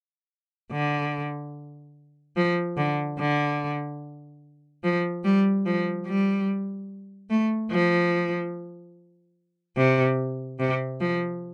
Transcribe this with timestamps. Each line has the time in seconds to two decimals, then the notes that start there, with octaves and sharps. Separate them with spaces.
0.72 D3
2.36 F3
2.77 D3
3.19 D3
4.84 F3
5.24 G3
5.66 F3
6.07 G3
7.30 A3
7.71 F3
9.77 C3
10.59 C3
11.00 F3